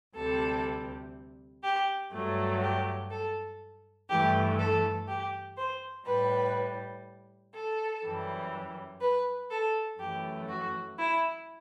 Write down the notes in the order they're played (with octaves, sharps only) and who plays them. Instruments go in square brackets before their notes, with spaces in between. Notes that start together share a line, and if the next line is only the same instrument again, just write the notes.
[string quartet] D2 C3 G3 A4
G4
G2 F#3 A3
G4
A4
G2 E3 A3 G4
A4
G4
C5
A2 G3 B4
A4
F#2 E3 G3
B4
A4
F#2 E3 A3 G4
F#4
E4